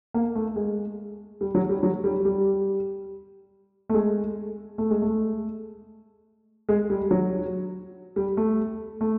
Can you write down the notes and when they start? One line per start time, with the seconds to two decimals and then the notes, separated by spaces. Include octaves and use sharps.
0.14 A#3
0.35 A3
0.56 G#3
1.41 G3
1.55 F#3
1.69 G3
1.83 F#3
2.04 G3
2.25 G3
3.89 A3
3.94 G#3
4.78 A3
4.90 G#3
5.02 A3
6.69 G#3
6.90 G3
7.11 F#3
8.16 G3
8.37 A3
9.01 A3